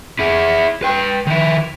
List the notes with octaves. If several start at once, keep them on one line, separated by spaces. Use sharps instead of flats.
E4 G#4
B4 G5
D#3 E4